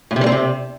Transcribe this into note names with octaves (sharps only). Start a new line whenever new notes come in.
A2
C3
G3
C4
C3